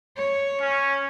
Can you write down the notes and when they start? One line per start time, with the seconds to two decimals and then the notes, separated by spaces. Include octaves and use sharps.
0.16 C#5
0.61 C#4